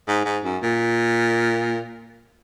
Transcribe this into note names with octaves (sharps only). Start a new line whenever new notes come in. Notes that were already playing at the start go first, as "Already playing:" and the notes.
G#2
G#2
F#2
A#2